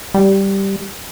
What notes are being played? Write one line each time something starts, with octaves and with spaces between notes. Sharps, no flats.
G3